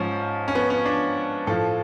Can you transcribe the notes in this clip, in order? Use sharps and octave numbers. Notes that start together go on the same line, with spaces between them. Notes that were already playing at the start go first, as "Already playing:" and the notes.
Already playing: G#2 F3 C#4
C#4
B3
C#4
D4
A2 F3 A4